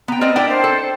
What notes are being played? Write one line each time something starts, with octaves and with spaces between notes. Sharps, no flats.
B3 G5 A#5
C4 A#4 D5 D#5
D4 E4 A#4 D5 G5
C5
A4